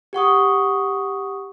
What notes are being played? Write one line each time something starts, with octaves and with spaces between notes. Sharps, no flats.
G4 F#5 C#6 D#6